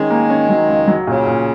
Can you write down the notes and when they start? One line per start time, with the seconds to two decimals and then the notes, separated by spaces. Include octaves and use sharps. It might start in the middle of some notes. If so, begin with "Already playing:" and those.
Already playing: D#3 G#3 C#4
0.10 A#3
0.30 C#4
0.49 F#3
0.68 C#2
0.88 F#3
1.07 A#2 C#3
1.27 A#2